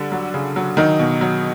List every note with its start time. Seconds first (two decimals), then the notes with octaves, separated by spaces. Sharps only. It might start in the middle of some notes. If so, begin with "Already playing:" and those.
Already playing: D3 G3 D4
0.12 F#3
0.34 C#3
0.56 F#3
0.77 D#3 F#3 D#4
0.99 B2
1.21 F#3